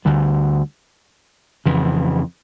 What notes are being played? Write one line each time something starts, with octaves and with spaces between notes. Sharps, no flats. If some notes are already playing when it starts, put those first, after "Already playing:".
D2 D3 G3
F2 C#3 E3